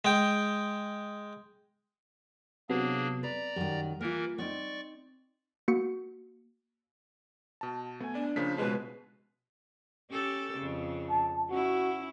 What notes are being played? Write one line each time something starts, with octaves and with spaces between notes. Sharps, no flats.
G#3 G5
C3 F#3 A#3 B3 D4 G#4
B4 D5 A#5
F#2 D#3 G3
E3 A#3 F4 A#4
B3 C4 D#4 D5 C#6
A#3 F#4 C#7
B2 A5
A3 B3 G#5
D4 D5
C#3 F3 A#3 C5 B6
B2 G#3 B4 C5 E5
C#4 G4 A4
F2 C#3
A5
C#4 E4 F#4